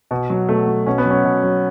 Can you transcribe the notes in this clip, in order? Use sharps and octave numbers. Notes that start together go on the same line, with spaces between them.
B2
F#3
B2 A3
F#3
B2 C#4
B3
F#3 C#4
B2
F#3